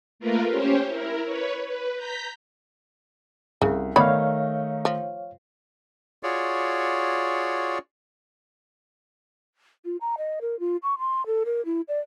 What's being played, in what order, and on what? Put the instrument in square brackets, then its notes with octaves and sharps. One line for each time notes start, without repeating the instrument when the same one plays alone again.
[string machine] A3 A#3 F4 A#4 B4
C#4 G4 C5 C#5
E4 A#4
B4 C#5
B4
A#5 G6 B6
[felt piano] C2 [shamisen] C#3
[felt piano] D#3 A3 D#4 [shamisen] B3 D5 B5 [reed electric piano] C#5 F5
[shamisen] F3
[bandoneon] F4 F#4 G#4 C#5 D5
[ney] F4
A#5
D#5
A#4
F4
C#6
C6
A4
A#4
E4
D5